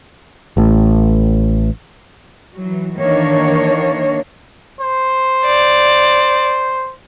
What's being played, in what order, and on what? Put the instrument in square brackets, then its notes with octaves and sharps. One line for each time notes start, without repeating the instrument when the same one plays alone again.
[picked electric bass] A1 A2
[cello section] E3 F#3
D#3 E3 A#3 D4 C#5
[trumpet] C5
[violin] D5